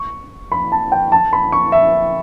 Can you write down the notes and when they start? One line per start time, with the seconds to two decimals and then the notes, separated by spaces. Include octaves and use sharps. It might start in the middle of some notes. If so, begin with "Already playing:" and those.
Already playing: C#6
0.52 B5
0.72 A5
0.92 G5
1.12 A5
1.33 B5
1.52 C#6
1.72 E5